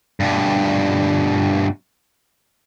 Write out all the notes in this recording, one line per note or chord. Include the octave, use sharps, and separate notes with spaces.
G2 B2